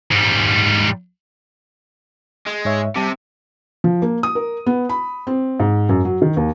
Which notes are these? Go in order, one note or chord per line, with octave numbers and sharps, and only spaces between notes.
G#2 G3
G#3
G#2 C#5 E5
C3 G3 A5 D6
F3
A#3
D#6
A#4
B3
B5
C4
G#2
F#2
F#3
D#3
D#2